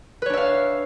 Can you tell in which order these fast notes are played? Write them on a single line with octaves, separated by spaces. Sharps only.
B4 C#5 D4 E5 F5